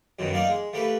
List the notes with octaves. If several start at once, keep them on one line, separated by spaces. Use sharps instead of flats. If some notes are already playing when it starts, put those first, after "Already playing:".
F#2 B2 D#3
A#3 D#4 D5 F5
G#3
A3 A#3 G4 B4